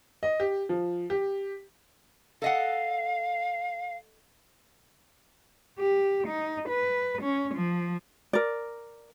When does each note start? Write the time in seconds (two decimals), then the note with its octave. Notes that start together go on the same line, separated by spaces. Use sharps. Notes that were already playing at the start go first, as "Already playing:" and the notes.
0.23 D#5
0.40 G4
0.69 F3
1.10 G4
2.42 A4 D#5 F5 F#5
5.79 G4
6.27 D#4
6.69 B4
7.23 C#4
7.55 F3
8.33 A#4 D5